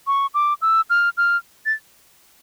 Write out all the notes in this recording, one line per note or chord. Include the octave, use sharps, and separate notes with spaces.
C#6
D6
E6
F6
F6
A6